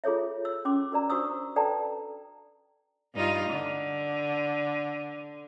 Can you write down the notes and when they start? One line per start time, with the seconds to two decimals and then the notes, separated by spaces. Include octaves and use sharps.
0.04 F4 G#4 A4 C#5 E5
0.45 E6
0.65 C#4 C6 D6
0.92 F#4 A#4 D5 A#5
1.10 D4 F#4 C5 C#6 D#6 E6
1.56 A4 B4 D5 G5 A5 A#5
3.14 G2 D#4 F4
3.49 D3